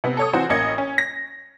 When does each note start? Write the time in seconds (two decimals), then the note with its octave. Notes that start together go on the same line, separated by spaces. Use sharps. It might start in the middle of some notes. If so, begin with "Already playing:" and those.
0.04 C3 B3
0.17 A4 C#5 D#6
0.33 E3 C4 F#4 C5
0.49 A1 A#3 C#4 D#5 G#6 C#7
0.78 C#4
0.98 A#6